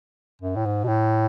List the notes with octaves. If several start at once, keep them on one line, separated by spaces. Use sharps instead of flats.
F#2
A2
G#2
B2
A2